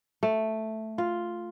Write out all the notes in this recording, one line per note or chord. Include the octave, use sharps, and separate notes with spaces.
A3
F4